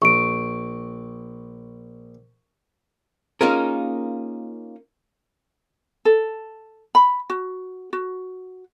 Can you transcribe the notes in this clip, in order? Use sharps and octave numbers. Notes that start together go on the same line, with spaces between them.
A#1 C#6 D7
A#3 C#4 D#4 F4 G#4 A#4
A4
B5
F#4
F#4